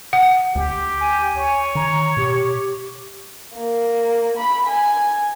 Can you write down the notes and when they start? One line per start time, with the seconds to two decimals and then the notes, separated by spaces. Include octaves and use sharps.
0.13 F#5
0.55 D2 G4
1.00 G#5
1.37 C#5
1.75 D#3 A#5
2.17 B2 G4
3.56 A#3
4.38 B5
4.67 G#5